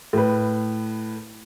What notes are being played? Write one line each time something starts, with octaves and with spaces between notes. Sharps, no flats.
A2 B4